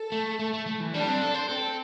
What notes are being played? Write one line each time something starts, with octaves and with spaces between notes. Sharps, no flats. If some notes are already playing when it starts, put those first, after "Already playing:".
Already playing: A4
A3
A3
A3
A3
E3
G3 D4
C4
A4
C5
C4 A4